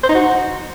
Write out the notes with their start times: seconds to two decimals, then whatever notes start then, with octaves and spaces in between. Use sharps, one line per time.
0.03 C5
0.09 D#4
0.15 F#4